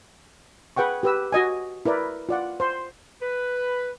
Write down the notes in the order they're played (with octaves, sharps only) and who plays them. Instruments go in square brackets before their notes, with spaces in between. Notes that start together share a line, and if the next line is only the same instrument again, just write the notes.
[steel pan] G#4 B4 F#5 G5 C#6
G4 B4 E6
F#4 D#5 G#5
E4 A#4 B4 D5
F4 D5 F#5
C5 C6
[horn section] B4